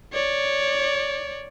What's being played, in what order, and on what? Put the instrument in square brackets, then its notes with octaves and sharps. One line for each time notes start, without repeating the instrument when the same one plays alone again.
[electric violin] C#5 D5